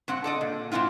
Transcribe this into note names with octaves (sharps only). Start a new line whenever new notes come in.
G2 C4 F#5
A4 D5 D#5
A#2
G#2 D#3 C4 E4 F4